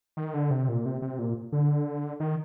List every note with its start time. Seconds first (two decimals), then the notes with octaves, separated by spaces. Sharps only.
0.17 D#3
0.34 D3
0.50 C3
0.69 A#2
0.86 C3
1.02 C3
1.19 A#2
1.52 D3
2.20 D#3